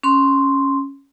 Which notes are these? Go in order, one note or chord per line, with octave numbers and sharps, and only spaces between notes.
C#4 C6